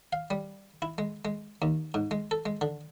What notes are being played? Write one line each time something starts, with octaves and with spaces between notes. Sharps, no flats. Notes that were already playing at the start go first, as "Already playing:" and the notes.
F5
G3
E4
G#3
G#3
D#2
G#2
G#3
A4
G#3
D3